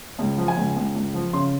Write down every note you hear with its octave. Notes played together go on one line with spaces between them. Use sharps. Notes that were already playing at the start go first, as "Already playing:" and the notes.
C#2
F3
G#5
C#2
C#2
C#2
F3
C#3 C6